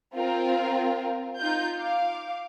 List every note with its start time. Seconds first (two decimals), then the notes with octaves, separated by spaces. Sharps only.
0.15 C4 F4 A#4
1.39 D#4 F4 G6
1.77 F5 D6